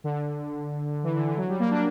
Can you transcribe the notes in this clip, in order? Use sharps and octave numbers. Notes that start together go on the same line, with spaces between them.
D3
E3
D3
E3
F#3
G3
A#3
D4